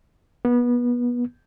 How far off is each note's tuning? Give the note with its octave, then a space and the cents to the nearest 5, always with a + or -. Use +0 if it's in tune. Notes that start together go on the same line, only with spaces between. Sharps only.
B3 -25